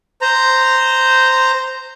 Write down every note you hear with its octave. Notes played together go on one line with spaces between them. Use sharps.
C5 A#5